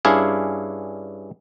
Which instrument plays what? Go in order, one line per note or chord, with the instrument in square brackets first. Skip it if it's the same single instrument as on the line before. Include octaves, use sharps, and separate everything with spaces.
[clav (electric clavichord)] G2 C#4 D4 E4 G#4 F5